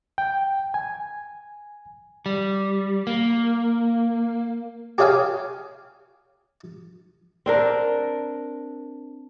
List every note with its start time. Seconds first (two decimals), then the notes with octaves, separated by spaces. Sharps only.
0.18 G5
0.74 G#5
2.26 G3
3.07 A#3
4.98 G4 G#4 C#5 F5 G5 G#5
7.46 C4 D4 A#4